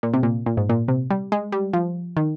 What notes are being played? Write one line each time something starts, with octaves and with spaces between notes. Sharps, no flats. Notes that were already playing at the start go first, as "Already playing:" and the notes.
A#2
C3
A#2
A#2
G#2
A#2
C3
G3
G#3
G3
F3
D#3